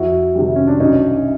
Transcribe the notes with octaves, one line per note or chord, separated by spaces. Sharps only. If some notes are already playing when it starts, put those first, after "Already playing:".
Already playing: F2 E4 F#4
C3 D#3 G3
C#4
D4
B1 C#4 D#4